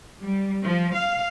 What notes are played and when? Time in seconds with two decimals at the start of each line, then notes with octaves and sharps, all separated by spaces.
0.21 G3
0.64 F3
0.95 F5